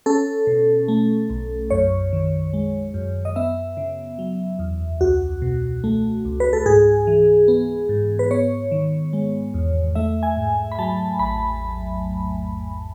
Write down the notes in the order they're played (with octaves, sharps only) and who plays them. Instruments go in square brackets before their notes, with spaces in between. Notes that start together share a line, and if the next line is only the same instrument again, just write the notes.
[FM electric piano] C#4 A4
B2
A3
B1
F#2 C#5
D#3
G#3
F#2
D#5
B3 E5
C#3
F#3
E2
C#2 F#4
B2
A3
C#2
B4
A4
G#2 G#4
E3
B3
G#2
B4
B3 C#5
D#3
G#3
E2
A3 E5
G#5
G#2
B5
F#3 A5
A1 B5